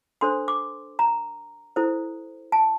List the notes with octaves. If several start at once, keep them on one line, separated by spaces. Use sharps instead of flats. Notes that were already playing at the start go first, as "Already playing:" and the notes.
D4 A4 C5 C6
D6
A#5
E4 A4 C5
A5